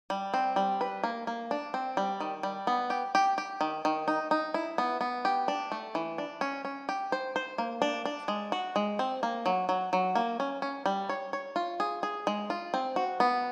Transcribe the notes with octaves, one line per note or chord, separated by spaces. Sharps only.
G3
C4
G3
B4
A#3
A#3
D4
C4
G3
D#3
G3
B3
G4
G4
G4
D#3
D#3
D#4
D#4
E4
B3
B3
G4
D4
A3
E3
D4
C#4
C#4
G4
C5
C5
A#3
D4
D4
G#3
F#4
G#3
C4
A#3
F#3
F#3
F#3
A#3
C#4
C#4
G3
C#5
C#5
F4
G#4
G#4
G#3
F4
C4
F#4
B3